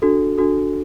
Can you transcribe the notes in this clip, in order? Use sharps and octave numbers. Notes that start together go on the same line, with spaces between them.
D4 F#4 A4
D4 F#4 A4